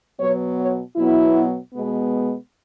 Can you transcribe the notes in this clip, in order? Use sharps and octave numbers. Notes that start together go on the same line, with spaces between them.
B2 F#3 B3 C#5
C#5
B2 F#3 B3 E4
B2 G#3 B3